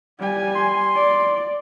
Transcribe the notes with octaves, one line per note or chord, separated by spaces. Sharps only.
G3 G#5
C6
D5